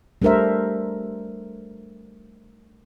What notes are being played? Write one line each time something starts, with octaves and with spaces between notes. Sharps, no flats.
G3 A3 D4 A#4 C5 E5